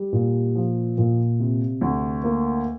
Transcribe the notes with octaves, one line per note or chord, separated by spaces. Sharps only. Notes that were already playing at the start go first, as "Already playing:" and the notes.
Already playing: G3
A#2
F3
A#2
C3
D2
A#3